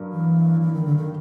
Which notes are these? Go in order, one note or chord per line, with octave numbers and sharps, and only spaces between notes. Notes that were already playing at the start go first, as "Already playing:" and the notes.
Already playing: G2 F#3 A#3
E3
E3
D#3
D3
D#3